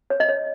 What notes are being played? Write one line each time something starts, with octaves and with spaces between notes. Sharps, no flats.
C#5
D#5
C#5